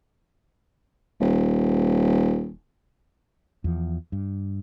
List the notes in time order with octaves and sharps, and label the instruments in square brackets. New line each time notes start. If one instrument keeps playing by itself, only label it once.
[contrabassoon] D#1
[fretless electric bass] E2 F3
G2